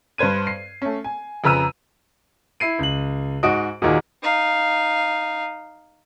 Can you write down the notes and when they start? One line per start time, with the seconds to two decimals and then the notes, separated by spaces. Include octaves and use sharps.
0.18 G2 B4 C5 G#6 D#7
0.47 C7
0.82 A3 C#4
1.04 G#5
1.44 F2 C#3 B4 A#5 E6 D#7
2.60 E4 C7 D#7
2.79 C#2 F#7
3.43 G#2 F#4 D#5 D7
3.82 D#2 A#2 D#4 F#4 G#4
4.23 D#4 F5